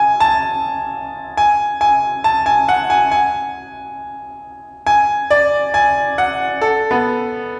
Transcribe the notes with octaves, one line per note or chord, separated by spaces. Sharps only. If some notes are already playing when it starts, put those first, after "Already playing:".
Already playing: G#5
A5
G#5
G#5
A5
G#5
F#5
G#5
G#5
G#5
D5
G#5
F#5
A4
B3